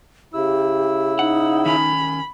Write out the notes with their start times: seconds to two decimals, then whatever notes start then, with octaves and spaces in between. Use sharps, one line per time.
0.34 C#3 E4 G4 E6
1.19 D#4 F#5
1.65 D#3 C#4 B5